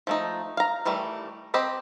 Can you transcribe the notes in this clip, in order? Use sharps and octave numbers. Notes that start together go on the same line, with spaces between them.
F3 A3 D#4
F5 A#5
D#3 E3 G3 A3
C4 G4 D#5 B5